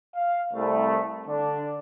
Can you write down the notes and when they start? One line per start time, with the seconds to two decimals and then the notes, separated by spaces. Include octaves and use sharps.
0.16 F5
0.53 C2 A3
1.27 D3 D4